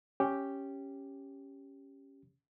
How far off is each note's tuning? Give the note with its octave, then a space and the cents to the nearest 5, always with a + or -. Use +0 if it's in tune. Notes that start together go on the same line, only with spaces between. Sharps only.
C#4 -5 G4 +0